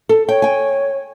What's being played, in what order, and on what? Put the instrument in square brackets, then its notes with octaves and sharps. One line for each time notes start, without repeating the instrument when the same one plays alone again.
[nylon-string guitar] A4
[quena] C#5 [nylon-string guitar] G5
[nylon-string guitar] G5 G#5